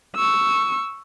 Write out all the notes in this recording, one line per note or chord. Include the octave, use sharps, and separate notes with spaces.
C#6 E6